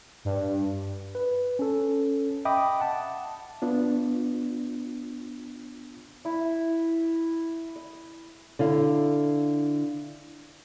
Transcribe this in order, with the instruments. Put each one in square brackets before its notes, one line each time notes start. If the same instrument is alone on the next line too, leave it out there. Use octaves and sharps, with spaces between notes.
[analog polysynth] G2
[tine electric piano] B4
C#4 A4
D#5 E5 G5 B5 D6 D#6
F#5 A5
[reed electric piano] B3 D4 F4
[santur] E4
D#5
[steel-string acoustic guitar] D3 E4 F5